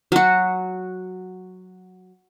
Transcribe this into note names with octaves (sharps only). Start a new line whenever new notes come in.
F#3 F#4